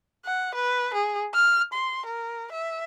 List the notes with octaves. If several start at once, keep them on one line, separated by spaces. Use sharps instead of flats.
F#5
B4
G#4
F6
C6
A#4
E5